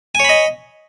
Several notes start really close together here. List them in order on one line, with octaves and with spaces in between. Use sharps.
G#5 C#5 B5 D#5